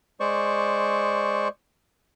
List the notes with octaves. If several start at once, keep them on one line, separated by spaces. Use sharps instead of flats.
G#3 C5 D5 C#6